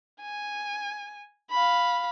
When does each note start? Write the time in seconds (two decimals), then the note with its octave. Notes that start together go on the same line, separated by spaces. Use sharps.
0.21 G#5
1.51 F5 B5